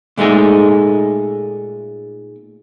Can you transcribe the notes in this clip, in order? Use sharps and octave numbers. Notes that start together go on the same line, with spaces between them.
A#2 G#3 A3 D#4 G#4